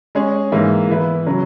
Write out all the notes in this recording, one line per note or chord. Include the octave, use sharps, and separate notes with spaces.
G#3 C#4 G#4
G#2 E3 A#3 E4
E3 B3 E4 B4
C#3 F#3